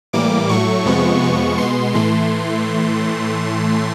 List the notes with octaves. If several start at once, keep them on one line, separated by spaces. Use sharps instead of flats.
A2 E3 G3 A#3 D6
A2 F#3 A3 C#6
F2 C3 F3 G#3 B3
F2 C3 F3 G#3 B3
B2 G#3 B3 C6
A2 E3 A3 C6